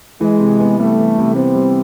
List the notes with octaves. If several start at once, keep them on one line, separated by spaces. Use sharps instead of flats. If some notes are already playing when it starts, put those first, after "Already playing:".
E3 G#3
C3
B3
G3 A3
E3
C3
B3 C4
G3